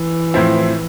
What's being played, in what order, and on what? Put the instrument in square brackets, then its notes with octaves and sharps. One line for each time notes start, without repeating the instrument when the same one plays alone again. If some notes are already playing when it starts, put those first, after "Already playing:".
Already playing: [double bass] E3
[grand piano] A2 F3 C4 E4